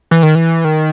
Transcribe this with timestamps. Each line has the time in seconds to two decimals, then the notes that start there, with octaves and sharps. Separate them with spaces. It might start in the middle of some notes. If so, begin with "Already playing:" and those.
0.11 E3
0.23 D#3
0.35 E3
0.65 D#3